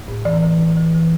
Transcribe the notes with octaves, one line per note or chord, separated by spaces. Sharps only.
A2
E3 D5
E3
E3
E3
E3